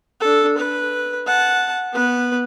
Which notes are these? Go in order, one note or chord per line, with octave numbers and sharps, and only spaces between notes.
D4 A4
B4
F#5 A5
B3 B4